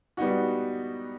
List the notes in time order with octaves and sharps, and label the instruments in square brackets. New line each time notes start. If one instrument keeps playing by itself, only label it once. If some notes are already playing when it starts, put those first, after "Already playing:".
[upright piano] G3 B3 D#4 F#4